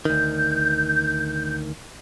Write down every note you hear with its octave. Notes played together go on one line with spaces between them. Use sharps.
D2 D#3 G6